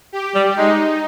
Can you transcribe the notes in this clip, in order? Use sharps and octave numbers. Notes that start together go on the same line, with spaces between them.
G4
G3
G#3 D#4